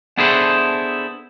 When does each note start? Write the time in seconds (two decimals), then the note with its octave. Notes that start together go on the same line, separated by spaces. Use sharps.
0.17 B3 D4 E4 G#4 A4 C5